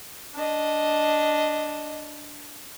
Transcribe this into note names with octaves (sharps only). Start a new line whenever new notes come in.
D4 D#5